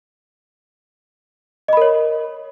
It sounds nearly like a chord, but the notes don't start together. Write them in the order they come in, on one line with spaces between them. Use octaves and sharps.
D#5 B5 A#4 C#5